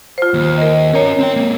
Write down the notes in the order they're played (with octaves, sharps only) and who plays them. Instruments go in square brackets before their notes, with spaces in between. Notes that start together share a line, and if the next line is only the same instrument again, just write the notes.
[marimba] F4 C5
[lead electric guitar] D#2
[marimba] A#4 D#5
[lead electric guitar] C#4 A#5 [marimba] A#4 C#5
[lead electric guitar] C4 G5
G#3 A#3